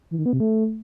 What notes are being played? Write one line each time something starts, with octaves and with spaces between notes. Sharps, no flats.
E3
D#3
B3
C3
A3